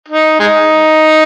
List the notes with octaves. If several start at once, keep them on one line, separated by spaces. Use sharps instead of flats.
D#4
G#3 D#4